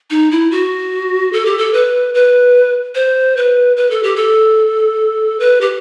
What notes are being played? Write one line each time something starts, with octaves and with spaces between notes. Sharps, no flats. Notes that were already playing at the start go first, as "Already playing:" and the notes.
D#4
E4
F#4
A4
G4
A4
B4
B4
C5
B4
B4
A4
G4
A4
B4
G4